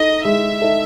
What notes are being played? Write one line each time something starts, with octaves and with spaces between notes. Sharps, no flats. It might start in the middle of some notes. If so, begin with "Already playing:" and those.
Already playing: D#4 A4 D#5
G#3 E5
D#4 A4